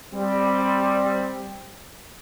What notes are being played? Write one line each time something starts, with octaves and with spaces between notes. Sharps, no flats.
G3 C4